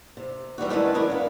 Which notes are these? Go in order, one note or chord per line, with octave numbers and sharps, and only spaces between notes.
C3
E3 G3 D#4 F#4
D#3 G#3 E4 B4 D#5 A5
F#3 A3 D4 E4 A#4 D#5
B3 F5